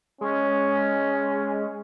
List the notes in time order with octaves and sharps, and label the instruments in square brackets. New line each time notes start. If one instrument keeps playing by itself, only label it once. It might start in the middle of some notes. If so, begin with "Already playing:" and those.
[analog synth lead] G#3 [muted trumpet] C#4